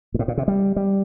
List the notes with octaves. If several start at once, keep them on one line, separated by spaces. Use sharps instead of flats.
A#2
A2
A#2
C3
G3
G3